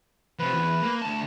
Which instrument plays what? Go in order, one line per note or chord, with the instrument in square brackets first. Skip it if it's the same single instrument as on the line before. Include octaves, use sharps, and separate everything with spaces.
[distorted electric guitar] C3 F3 [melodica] B4
[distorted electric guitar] E2
A#3
D2 A5